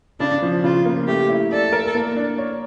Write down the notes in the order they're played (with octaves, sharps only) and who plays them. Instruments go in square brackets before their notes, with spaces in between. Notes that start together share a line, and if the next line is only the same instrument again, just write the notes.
[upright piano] C#3 [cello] D4
[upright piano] F3
[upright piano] C#3 [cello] F4
[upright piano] A#3
[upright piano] A3 [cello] G4
[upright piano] E4
[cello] A4 [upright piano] D5
[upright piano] A#4
A#3
D4
C#5